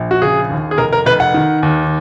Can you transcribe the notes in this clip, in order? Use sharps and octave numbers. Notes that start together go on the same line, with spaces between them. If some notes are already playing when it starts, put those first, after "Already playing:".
Already playing: A#1
F#4
C#3 G#4
D#2
G#4
F1 A#4
A#4
F1 B4
F#5
D#3
D#2